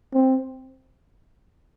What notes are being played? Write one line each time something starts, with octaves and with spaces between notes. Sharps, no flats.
C4